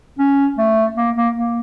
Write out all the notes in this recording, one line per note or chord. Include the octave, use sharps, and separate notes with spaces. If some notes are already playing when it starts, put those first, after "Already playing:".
C#4
A3
A#3
A#3
A#3